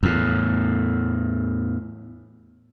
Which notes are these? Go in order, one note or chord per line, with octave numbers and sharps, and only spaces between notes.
E2 A2